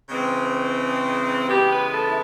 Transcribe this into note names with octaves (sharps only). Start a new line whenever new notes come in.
C#3 E3 G#3 C4
C#3 E3 G#3 B3 G4
B4
A4
E4